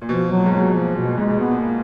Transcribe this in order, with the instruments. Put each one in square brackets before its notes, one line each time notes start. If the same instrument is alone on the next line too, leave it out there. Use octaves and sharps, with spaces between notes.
[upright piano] A#2
[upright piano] B2 [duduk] F3
[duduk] F#3
[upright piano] A#2
G#2
[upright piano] A#2 [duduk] F#3
[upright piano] B2
A#2
[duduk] F3
B2
[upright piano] A#2
[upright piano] G#2 [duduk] G#3
[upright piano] B2
[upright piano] A#2 [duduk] B3
[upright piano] A#2
[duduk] A#3